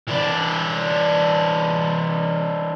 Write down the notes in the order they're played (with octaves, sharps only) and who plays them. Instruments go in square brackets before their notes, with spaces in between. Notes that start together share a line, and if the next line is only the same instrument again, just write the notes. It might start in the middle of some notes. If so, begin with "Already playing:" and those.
[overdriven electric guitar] E3 D4